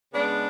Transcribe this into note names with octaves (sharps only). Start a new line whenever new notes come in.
C#3 G#3 B3 D4